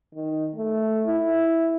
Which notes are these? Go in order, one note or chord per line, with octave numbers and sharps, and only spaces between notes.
D#3
A3
E4